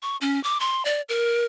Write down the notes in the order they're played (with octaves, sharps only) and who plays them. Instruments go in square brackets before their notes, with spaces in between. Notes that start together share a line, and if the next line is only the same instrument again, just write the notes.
[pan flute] C#6
C#4
D6
C6
D5
A#4